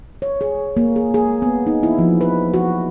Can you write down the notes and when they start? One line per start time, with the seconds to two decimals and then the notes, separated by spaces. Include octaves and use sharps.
0.22 C#5
0.41 G#4
0.77 A#3
0.96 G#4
1.14 G#4
1.42 B3
1.67 D#4
1.83 E4
1.99 F3
2.21 B4
2.54 F#4